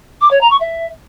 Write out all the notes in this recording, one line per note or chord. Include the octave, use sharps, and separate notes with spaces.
D6
C#5
A#5
C#6
E5